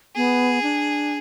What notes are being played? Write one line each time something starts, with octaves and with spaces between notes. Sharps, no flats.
B3 G#4
D4